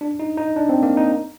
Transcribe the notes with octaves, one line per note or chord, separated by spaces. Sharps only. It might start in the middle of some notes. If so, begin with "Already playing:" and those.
D4
D#4
D#4
D4
C4
A#3
D#4